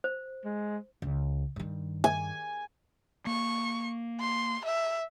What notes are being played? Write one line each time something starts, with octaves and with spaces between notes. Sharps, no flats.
C5
G#3
C#2
G2 D#3
G#5
A#3 C#6
C6
E5